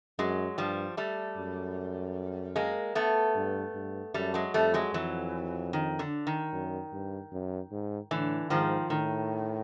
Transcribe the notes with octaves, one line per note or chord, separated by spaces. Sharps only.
F#2 F#3 G#3
G2 F3 G3
G3 A3
F#2
G#3 A#3
A3 B3
G2
G2
F#2 G3 A3
F#3 G#3
F2 G3 A3
F#3 G#3
F2 E3 F#3
D#3
D3
D#3
F#2
G2
F#2
G#2
A2 D3 E3
G#2 D#3 F3
A2 D#3